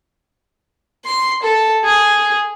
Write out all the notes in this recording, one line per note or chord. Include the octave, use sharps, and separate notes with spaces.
C6
A4
G#4